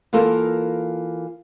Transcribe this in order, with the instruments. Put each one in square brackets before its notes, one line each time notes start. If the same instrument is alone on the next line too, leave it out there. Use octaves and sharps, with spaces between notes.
[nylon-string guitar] E3 A#3 F4 A4 A#4